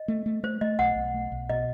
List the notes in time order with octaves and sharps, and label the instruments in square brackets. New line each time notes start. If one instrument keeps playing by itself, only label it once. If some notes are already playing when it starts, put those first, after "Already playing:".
Already playing: [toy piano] D#5
[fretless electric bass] A3
A3
[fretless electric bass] A3 [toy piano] C5
[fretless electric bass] A3 [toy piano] D#5
[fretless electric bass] B1 [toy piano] F#5
[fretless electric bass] B1
A3
B1
[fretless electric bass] B2 [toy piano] D#5